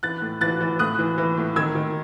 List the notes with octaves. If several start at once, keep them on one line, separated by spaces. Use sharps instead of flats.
E3 F#6 A6
A2
E3 F#6 A6
E3
A2 D#6 F#6
E3
E3
A2
D#3 E6 G#6
D#3